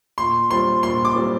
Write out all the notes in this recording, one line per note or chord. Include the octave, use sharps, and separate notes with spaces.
A#2 C6
G3 C4 F4 C6
A#2 C6
D6
G3 C4 F4